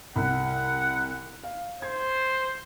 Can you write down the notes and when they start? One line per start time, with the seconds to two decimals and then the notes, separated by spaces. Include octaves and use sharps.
0.16 C2 F#5
1.44 F5
1.82 C5 G#6